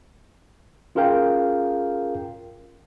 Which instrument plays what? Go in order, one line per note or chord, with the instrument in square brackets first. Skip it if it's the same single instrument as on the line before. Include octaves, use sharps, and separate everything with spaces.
[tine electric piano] C#4 F4 G#4 A#4 F5 G5